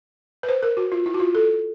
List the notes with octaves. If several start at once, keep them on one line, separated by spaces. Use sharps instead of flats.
B4
C5
A#4
F#4
F4
E4
F#4
F4
A4